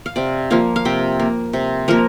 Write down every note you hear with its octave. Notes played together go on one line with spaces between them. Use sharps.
F5
C3 D5
F3 A#3 F5
F5
C3 G5
A#3
C3
F3 A#3 A#4